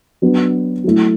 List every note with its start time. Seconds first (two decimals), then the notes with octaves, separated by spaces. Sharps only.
0.22 F#3 B3 D4
0.84 F#3 A3 E4